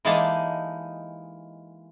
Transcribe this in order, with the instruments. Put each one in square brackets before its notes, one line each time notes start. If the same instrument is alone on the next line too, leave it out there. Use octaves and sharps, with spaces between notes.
[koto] E3 G#3 A#3 D#4 G4 A5